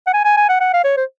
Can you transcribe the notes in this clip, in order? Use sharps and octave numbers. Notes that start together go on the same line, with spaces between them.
F#5
G#5
G#5
G#5
F#5
F#5
F5
C#5
C5